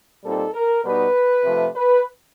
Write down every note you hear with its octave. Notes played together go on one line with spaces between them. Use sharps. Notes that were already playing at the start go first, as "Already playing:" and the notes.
A#2 G3 C4 D#4 A4
A#4
B2 G3 B3 D#4 B4
C3 F3 A3
B4